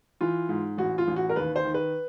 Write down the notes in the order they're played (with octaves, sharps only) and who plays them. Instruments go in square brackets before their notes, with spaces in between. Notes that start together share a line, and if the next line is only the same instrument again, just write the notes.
[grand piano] E3 F4
G#2
A1 F#4
F4
A1
F#4
A#4
D#2 B4
C5
D#3
B4